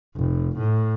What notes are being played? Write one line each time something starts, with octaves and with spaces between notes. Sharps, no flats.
F1
A2